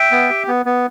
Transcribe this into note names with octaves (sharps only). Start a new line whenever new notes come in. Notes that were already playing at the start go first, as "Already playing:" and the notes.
Already playing: E5 G5
B3
G4
B3
B3